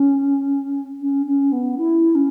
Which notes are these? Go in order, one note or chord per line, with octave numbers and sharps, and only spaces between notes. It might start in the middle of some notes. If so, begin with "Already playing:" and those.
Already playing: C#4
C#4
C#4
B3
E4
C#4